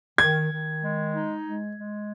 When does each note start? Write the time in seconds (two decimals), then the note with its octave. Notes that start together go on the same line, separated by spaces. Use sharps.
0.18 D#3 G#6
0.50 D#3
0.82 G#3
1.14 D#4
1.44 G#3
1.76 G#3